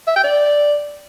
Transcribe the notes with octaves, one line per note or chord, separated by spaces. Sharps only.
E5
G5
D5